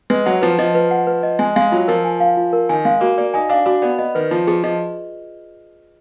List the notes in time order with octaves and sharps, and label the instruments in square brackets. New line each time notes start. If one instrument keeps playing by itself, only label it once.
[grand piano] G#3 [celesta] B4
[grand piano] F#3 [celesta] F#5
[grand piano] F3 [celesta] B4
[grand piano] F3 [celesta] D#5
[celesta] B4
F#5
B4
D#5
[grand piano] G#3 [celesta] G#5
[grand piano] G#3 [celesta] F5
[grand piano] F#3 [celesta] F4
[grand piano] F3 [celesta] A#4
[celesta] G#5
F5
F4
A#4
[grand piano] D#3 [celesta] G#5
[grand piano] G#3 [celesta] F5
[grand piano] A#3 [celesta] F#4
[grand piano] A#3 [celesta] D5
[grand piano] D#4 [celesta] G#5
[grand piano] D4 [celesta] F5
[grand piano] D4 [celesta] F#4
[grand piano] B3 [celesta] D5
[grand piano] B3 [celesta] D#5
[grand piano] D#3 [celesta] B4
[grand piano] F3 [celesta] F4
[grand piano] F3 [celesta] G#4
[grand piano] F3 [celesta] D#5